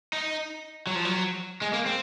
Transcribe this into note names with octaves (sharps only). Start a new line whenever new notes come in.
D#4
F#3
F3
F#3
G#3
A#3
C4